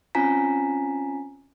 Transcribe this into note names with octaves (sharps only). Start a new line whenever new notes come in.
C4 C#4 F4 G#5 A#5 B6